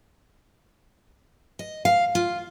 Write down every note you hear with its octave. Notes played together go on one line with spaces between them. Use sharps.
D#5
F5
F4